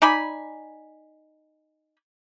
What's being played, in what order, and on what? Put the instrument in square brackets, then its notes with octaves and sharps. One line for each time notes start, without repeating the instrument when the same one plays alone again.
[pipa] D#4 D5 G#5 B5